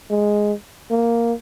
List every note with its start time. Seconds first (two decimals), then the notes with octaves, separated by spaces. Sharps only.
0.10 G#3
0.91 A#3